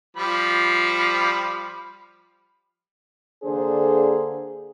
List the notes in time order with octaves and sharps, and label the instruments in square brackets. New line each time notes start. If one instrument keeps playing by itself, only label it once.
[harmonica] F3 G3 B5
[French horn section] D3 A#3 D4 G#4 A4 C5